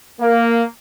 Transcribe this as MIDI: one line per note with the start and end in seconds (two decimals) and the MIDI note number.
0.21 0.63 58